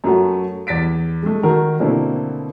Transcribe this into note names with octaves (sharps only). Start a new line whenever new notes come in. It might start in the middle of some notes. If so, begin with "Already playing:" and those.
F#2 F#3 A3 F#4
E2 A6 B6 D7
G#3 A3
D#3 F#4 A#4
B2 D3 A3 A#3 C4 E4